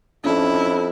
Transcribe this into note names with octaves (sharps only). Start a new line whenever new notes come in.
F2 C#4 D4 E4